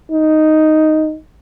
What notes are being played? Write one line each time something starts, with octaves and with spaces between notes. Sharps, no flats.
D#4